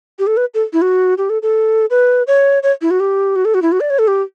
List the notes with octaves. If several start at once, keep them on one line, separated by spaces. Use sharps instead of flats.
G4
A4
B4
A4
E4
F#4
G4
A4
A4
B4
C#5
C#5
E4
F#4
G4
F#4
A4
F#4
E4
F#4
D5
C#5
A4
G4